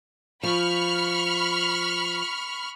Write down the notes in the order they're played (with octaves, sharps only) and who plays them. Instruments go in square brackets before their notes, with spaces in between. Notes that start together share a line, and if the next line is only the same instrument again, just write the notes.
[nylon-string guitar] F3 [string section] B5 C#6 F6